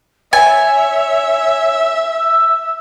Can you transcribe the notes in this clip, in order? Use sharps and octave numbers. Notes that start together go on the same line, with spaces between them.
C#5 E5 G#5
E6